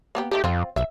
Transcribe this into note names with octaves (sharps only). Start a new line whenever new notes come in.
A#3 B3 G4
D#3 A3 D#4 G4
F2 C4 F4
B1 E5